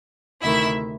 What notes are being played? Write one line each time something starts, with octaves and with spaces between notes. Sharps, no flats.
D2 C3 D#3 E4 E5